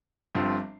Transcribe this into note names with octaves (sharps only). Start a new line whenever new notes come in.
G1 G2 F3 C4